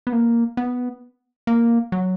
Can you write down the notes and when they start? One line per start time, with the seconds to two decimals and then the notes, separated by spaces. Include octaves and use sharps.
0.07 B3
0.13 A#3
0.57 B3
1.47 A#3
1.92 F#3